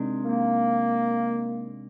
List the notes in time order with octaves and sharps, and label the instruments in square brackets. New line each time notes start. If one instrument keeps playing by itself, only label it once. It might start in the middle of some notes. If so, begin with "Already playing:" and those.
Already playing: [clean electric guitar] C3 D#3 G#3 D4
[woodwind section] A#3